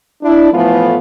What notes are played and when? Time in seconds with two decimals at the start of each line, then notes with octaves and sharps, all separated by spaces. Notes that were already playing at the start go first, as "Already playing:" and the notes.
0.23 D4 E4
0.53 A2 E3 F3 A3 B3 F4